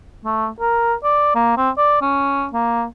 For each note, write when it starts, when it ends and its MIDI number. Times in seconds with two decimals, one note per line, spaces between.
0.25 0.47 57
0.60 0.94 70
1.03 1.33 74
1.35 1.55 58
1.57 1.70 60
1.77 2.00 74
2.01 2.47 61
2.53 2.84 58